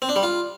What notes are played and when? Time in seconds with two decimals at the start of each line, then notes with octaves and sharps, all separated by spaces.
0.02 C4
0.09 D4
0.16 G3
0.23 F4